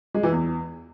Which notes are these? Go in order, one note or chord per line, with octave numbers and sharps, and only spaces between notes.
G#3
E3
E2